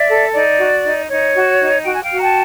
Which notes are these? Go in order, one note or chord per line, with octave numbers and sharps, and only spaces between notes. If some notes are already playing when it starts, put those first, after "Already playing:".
Already playing: D5 E5
A4
D#4 D5
F#4
D#4
D#4 C#5
F#4
D#4
F#4 G5
G#5
F5 G5
F#4
A#5
G5 A5